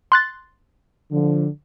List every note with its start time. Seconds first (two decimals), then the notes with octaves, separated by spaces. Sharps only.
0.12 C6 F#6 A6
1.11 D3 F3